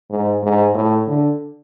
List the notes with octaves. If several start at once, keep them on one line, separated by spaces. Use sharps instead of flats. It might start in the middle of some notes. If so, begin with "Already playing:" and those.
G#2
G#2
A2
D3